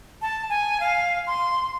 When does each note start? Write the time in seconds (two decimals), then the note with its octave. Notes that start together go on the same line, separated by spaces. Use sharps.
0.22 A5
0.49 G#5
0.80 F5
1.27 C6